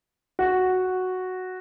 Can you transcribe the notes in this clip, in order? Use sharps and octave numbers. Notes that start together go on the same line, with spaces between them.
F#4